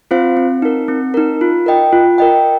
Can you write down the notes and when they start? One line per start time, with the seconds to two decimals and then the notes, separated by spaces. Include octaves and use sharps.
0.11 C4 F4 C5 F5
0.37 C4
0.62 D#4 A#4
0.88 C4
1.14 D#4 A#4
1.41 F4
1.66 A#4 D#5 G5
1.93 F4
2.18 A#4 D#5 G5